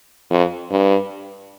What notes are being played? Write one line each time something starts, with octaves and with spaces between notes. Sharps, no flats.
F2
G2